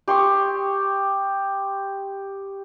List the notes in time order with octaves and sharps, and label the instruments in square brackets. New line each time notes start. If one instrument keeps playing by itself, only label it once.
[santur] G4 C6 C#6 D#6